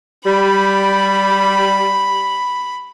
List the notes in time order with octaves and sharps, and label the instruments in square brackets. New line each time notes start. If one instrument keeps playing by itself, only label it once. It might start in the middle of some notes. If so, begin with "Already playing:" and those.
[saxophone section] G3 [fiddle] B5